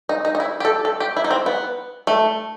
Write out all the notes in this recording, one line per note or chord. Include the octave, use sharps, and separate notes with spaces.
D#4
D#4
D#4
E4
G4
A4
A4
G4
E4
D#4
C4
B3
A3